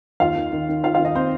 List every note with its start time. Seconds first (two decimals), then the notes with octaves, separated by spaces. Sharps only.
0.20 D#2 F4 F5
0.36 D#3
0.52 D#3
0.69 D#3
0.84 D#3 F4 F5
0.94 F4 F5
0.99 D#3
1.05 D#4 D#5
1.15 C4 C5